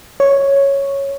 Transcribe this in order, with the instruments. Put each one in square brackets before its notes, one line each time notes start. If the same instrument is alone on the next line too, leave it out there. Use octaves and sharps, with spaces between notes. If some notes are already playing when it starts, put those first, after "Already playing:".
[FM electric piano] C#5